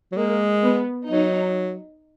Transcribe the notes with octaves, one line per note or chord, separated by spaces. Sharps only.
F#3
G#3 A#3
B3
F#3 D#4